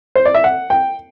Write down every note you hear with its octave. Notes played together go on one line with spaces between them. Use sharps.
C5
D5
E5
F#5
G5